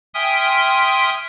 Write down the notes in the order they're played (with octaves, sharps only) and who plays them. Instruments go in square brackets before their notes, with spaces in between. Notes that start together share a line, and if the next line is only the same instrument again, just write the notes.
[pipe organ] E5 G5 G#5 C6 D#6 F6